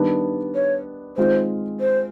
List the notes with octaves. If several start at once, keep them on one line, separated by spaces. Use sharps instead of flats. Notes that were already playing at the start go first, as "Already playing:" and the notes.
Already playing: D#3 G3 B3 D4
C#5
D#3 G#3 C4 F4 C5
C5